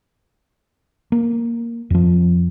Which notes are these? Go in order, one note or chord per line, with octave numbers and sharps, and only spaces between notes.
A#3
F2 F3